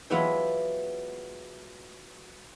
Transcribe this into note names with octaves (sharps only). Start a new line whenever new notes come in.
E3 F#3 G#3 B3 E4 F4